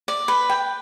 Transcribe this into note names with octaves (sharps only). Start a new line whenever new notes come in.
D5
B4
G5